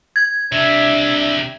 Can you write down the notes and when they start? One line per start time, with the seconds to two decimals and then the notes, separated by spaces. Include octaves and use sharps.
0.16 G#6
0.52 C3 G3 D4 E5